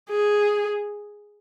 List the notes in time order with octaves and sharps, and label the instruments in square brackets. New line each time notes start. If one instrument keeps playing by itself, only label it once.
[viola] G#4